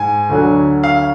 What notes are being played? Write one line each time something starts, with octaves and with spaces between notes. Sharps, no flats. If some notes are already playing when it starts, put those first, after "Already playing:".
Already playing: G#2 G#5
D2 D3 F#3
F5